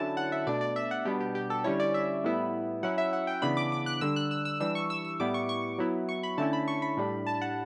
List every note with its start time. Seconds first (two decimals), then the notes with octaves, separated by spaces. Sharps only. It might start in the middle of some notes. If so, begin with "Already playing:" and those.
Already playing: D3 F#3 C#4 E4 A5
0.17 F#5
0.32 E5
0.47 B2 A3 D4 D5
0.61 D5
0.76 E5
0.91 F#5
1.05 B2 G3 B3 D4 G4
1.20 G4
1.35 G4
1.50 A4
1.64 D3 G3 C#4 E4 C#5
1.80 D5
1.94 E5
2.24 A2 G3 B3 E4
2.83 F#3 C#4 E4 F#5
2.98 E5
3.13 F#5
3.27 G5
3.42 C#3 E3 B3 D4 B5
3.57 D6
3.72 D6
3.86 F#6
4.01 D3 G3 D4 E6
4.16 F#6
4.31 E6
4.45 E6
4.60 E3 G3 D4 E6
4.75 C#6
4.90 E6
5.05 E6
5.19 A2 G3 B3 E4 D6
5.34 C#6
5.49 C#6
5.78 F#3 B3 E4
6.09 C#6
6.23 B5
6.38 D3 A3 C#4 E4 A5
6.53 B5
6.68 C#6
6.82 B5
6.97 A2 G3 D4
7.27 A5
7.41 F#5